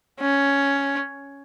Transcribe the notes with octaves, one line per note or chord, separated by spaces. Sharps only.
C#4